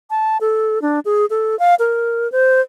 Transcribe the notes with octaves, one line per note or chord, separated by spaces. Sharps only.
A5
A4
D4
G#4
A4
F5
A#4
C5